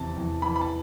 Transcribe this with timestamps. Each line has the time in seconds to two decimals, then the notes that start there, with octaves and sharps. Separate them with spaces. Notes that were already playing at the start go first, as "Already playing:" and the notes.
Already playing: E2 C3 A5
0.17 E2
0.42 E3 B5
0.56 B5
0.61 A5